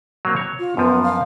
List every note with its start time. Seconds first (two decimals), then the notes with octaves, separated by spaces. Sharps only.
0.25 F#3 A#3 C4
0.36 C#5
0.59 F4
0.77 F#2 F3 B3
1.03 F5